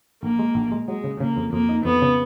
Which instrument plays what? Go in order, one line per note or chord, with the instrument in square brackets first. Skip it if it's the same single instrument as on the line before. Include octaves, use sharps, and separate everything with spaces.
[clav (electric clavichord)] A#1 [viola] A#3
[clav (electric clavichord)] G#3
A#1
G#3
[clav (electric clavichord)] F#3 [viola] G#3
[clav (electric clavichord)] C#3
[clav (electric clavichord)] C#3 [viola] A#3
[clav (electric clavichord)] F2
[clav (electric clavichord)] F2 [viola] A#3
[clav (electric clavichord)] D#4
[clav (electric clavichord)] F2 [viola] B3
[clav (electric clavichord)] C#3